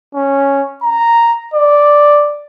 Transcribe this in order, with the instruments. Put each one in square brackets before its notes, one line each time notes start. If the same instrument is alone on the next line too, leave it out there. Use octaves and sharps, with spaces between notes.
[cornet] C#4
A#5
D5